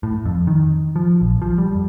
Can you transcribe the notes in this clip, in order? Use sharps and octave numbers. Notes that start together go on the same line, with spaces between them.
A2
F2
D#3
F3
A#1
F3
G3
F2